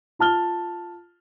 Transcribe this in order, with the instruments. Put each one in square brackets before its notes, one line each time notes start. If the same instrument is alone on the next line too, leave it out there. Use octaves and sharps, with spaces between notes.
[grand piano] F4 A5 F6 G7